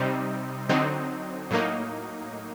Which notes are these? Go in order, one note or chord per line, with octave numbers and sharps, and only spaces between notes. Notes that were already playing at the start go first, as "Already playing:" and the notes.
Already playing: C3 G3 C4 D#4
D3 F#3 C4 D#4
A2 F#3 A#3 D#4